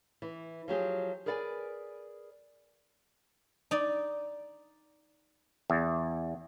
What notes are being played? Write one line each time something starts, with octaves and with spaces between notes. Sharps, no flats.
E3
F3 F#3 G4 G#4
G#4 A#4 B4 D5 G5 G#5
D#4 D5
E2